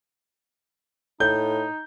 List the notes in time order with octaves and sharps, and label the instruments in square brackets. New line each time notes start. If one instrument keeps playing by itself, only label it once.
[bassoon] A2 [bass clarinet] D#4 [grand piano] G6